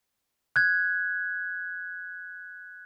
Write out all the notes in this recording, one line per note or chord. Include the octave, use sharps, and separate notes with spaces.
F#6 G#6